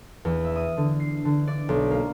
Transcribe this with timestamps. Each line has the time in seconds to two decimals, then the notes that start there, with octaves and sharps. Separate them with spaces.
0.25 E2
0.44 E5
0.56 D#6
0.77 D3
1.00 C7
1.25 D3
1.48 D5
1.69 B1
1.91 A#3